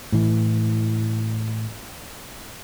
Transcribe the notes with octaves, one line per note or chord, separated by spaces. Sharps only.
A2 E3